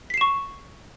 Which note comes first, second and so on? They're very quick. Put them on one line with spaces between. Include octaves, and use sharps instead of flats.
B6 C7 E7 C#6